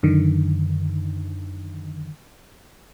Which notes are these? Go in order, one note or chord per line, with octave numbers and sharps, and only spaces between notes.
F#2 D3 D#3